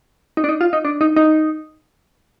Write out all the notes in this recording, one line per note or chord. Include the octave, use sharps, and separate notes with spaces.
D#4
D4
D#4
F4
D#4
D4
D#4
D#4